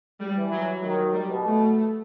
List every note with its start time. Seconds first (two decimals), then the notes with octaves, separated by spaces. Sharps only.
0.20 G3
0.36 E3
0.51 F#3
0.82 D#3 F#3
1.13 G3
1.29 B2
1.43 A3